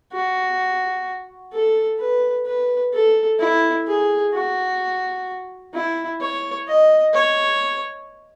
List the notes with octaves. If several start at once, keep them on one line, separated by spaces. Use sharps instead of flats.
F#4
A4
B4
B4
A4
E4
G#4
F#4
E4
C#5
D#5
C#5